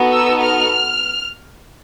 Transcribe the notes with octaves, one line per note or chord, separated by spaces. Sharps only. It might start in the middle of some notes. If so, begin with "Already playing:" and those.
Already playing: B3 D#4 F#4 A4
E6
F6